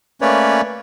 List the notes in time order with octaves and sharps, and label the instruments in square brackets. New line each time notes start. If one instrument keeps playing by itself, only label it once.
[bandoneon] A3 A#3 C#4 B4 C#5 D5